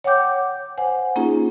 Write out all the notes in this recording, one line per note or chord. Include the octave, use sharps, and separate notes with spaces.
C#5 F#5 G5 D6 G6
C5 F#5 G#5
A#3 C#4 D#4 F4 G#4